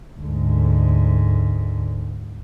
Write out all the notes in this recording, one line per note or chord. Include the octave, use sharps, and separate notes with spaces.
D2 G#2